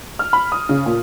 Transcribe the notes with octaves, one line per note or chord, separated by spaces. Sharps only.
F6
B5
D#6
C#3
A#2